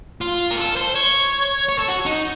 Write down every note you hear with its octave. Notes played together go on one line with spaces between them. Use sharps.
F4
A#4
A4
C5
C#5
C#5
A4
F#4
D#4